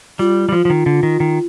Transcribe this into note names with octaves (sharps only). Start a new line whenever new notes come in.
G3 F4
G3
F3 F4
F3
D#3
D3
D#3
D#3